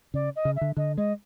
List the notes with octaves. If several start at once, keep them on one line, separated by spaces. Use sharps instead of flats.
C#3 D5
D#5
C#3
E5
D3
D3 D#5
G#3 D#5